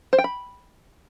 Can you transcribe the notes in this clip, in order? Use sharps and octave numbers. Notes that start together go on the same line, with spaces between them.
C5
G5
B5